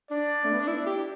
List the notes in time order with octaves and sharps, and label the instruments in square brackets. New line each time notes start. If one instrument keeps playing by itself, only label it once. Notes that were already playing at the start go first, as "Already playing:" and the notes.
[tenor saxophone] D4 [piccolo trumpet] D5
[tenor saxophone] A3
B3
D4
E4
G4